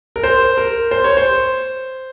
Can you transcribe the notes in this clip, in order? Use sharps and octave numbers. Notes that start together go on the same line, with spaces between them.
A#4
C5
A#4
C5
C#5
C5